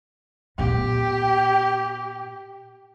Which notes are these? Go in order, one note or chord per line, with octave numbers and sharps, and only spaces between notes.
A#2 B3 G4